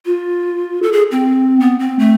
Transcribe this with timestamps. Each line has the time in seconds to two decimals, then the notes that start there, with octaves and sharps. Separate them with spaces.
0.05 F4
0.83 A4
0.92 G#4
1.11 C4
1.60 B3
1.79 C4
1.99 A3